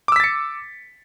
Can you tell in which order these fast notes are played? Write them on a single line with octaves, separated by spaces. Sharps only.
D6 E6 B6 A6 C#7